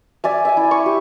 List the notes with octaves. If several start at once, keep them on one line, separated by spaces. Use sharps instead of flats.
D5 E5 G#5
E5 G#5
E4
C#6
G4